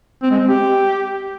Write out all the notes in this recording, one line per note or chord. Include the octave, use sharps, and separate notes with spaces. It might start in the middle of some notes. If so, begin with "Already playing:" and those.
C4
G#3
C4
G4